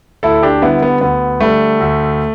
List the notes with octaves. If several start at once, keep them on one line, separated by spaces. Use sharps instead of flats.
D2 E4 A4
D4 G4
D3 G3 B3 E4
B3
D2 B3
D3 G3 A3
D2